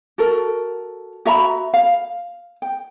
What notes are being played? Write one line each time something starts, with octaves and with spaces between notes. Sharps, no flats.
F#4 A4 A#4
F#4 E5 A#5 B5
F5
G5